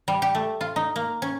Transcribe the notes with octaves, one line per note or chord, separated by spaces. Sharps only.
G3
G4
A3
F4
D#4
A#3
C#4